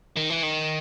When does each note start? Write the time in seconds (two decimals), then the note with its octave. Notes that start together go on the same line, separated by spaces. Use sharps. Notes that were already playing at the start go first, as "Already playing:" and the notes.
0.17 D#3
0.30 E3
0.43 D#3